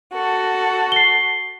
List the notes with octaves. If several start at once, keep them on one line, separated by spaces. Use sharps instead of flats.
F#4 A4
C7 G7